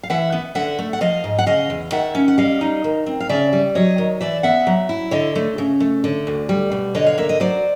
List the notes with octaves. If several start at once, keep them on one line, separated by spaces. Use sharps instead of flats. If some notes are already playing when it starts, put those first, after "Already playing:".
F5
E3 E5 F#5
B3
D3 E5 F#5
A3
F#5
F3 D#5 F5
G#2
F#5
C#3 D#5 F5
E2
D#3 E5 F#5
C#4
F#5
G3 D#5 F5
D#4
D#3
C4
F5
C#3 D5 E5
G3
F#3 C#5 D#5
D#3
E3 D5 E5
B3 E5 F#5
F#3
E4
D3 C#5 D#5
A3
C#3
A3
D3
D2
G3
B2
D3 C#5 D#5
F5
A#3 E5
D#5
F#3 C5 D5